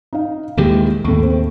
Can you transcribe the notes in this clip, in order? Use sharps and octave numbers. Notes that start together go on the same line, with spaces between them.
D#4 F5
D#2 A#2 D#3 E3 G#3 G4
D#2 A2 A4 C#6
C4